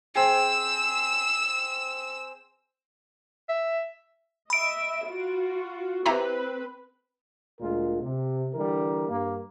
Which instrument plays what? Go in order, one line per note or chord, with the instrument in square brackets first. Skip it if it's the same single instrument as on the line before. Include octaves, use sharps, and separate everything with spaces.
[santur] C4 G#4 [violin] E6
[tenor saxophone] E5
[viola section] D#5 E5 [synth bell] B5 D7
[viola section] F4 F#4
[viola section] C4 B4 [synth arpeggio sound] E4 G4 A#5
[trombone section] D2 A#2 G#3 F4 A#4
C3
D3 E3 G3 A#4
G2 A#3